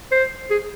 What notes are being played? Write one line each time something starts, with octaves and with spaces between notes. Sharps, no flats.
C5
G#4